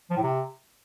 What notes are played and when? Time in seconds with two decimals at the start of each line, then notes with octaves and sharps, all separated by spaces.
0.11 F3
0.17 A2
0.23 C3